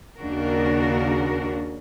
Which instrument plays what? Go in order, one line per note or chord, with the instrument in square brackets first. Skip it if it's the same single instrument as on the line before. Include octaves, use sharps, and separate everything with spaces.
[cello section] D#2 C#3 A#3 D4 F#4 A#4